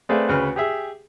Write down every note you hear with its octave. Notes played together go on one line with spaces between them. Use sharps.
A3 C4 G#4 B4 D5 F5
D2 C#3 B4 F6
G4 G#4 E5